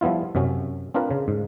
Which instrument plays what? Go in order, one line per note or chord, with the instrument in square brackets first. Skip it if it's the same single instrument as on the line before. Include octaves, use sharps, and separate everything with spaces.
[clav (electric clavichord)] F3 G3 B3 E4 F4
F#2 C3 F#3 C#4
C4 D4 F4 A#4 B4
C#3
G#2